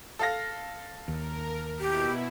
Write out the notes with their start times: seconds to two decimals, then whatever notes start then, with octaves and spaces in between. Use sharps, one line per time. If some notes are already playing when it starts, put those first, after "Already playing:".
0.19 A4 F5 A#6
1.08 D#2 A#4
1.80 B2 E4 G4